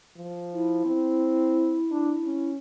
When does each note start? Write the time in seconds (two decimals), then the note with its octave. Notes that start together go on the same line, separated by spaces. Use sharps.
0.16 F3
0.54 E4
0.85 C4
1.91 D4
2.24 C#4